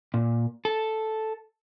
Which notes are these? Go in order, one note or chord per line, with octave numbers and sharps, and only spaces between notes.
A#2
A4